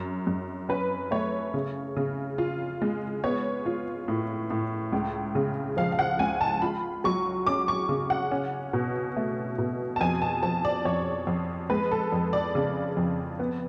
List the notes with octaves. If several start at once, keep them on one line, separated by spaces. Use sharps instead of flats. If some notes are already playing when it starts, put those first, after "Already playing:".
Already playing: F#2
F#2
C#4 B4
A3 C#5
C#3
C#3
F4
G#3
B3 C#5
F4
A2
A2
C#2
C#3
F3 F5
F5
F#5
C#2 G#5
A5
F4 B5
F#3 C#6
C#4 D6
C#6
C#3
F#5
C#4
B2
A3
B2
A5
F2 G#5
A5
F3 A5
D5
F2 C#5
F2
G#3 B4
A4
F2
D5
C#3
F2
B3